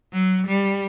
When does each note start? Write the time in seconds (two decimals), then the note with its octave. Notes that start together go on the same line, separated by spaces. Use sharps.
0.13 F#3
0.46 G3